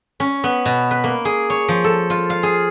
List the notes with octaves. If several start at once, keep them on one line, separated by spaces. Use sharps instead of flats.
C#4
B3
B2
B4
A#3
G#4
C#5
F3
A4
F4
F5
G#4